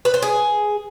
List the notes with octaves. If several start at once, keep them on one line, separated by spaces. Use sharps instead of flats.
B4
C5
G#4